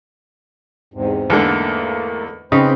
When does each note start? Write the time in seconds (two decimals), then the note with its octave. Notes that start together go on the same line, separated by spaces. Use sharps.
0.94 E2 G#2 C3
1.30 E2 G#2 D3 A3 A#3
2.52 C#3 C4 D#4 B4 C5